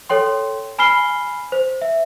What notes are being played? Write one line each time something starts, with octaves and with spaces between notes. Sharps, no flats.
A4 C#5 G5 C6
G#5 B5 F6 C7 G7
C5
E5